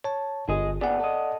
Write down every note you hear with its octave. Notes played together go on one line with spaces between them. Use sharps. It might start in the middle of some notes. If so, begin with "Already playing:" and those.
C#5 A5
G1 G#4 D#5
A#2 B3 G#4 D5 F#5
A4 D#5